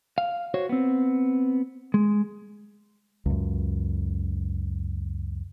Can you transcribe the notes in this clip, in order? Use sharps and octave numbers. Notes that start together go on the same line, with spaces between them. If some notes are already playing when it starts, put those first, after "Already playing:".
F5
F#4 C5 C#5
B3 C4
G#3
C#2 F#2